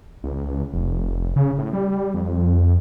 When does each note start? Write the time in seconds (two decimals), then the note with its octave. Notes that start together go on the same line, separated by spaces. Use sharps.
0.24 C#2
0.74 F1
1.36 C#3
1.58 A2
1.73 G3
2.14 F2